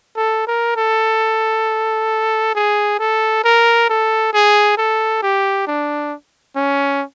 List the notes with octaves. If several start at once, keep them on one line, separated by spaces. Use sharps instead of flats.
A4
A#4
A4
G#4
A4
A#4
A4
G#4
A4
G4
D4
C#4